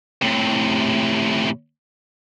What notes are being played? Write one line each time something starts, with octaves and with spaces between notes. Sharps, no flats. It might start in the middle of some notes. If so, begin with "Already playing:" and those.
A2 C3